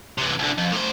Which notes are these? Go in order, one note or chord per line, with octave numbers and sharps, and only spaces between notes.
C3 E3
C2 D3
F2
A2 C5